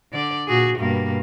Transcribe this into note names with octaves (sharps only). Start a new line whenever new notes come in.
D3 D5
A#2 F#4 G#4
G2 B2 A#3